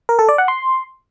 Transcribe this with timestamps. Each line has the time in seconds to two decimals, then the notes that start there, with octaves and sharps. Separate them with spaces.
0.09 A#4
0.19 A4
0.29 D5
0.38 F#5
0.48 C6